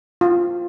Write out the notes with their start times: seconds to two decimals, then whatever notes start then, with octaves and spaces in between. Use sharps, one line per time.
0.21 F4